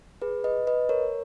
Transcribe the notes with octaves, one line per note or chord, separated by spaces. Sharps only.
G#4 B4
B4 D#5
B4 D#5
A#4 C#5